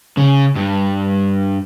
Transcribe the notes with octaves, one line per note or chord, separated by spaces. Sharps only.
C#3
G2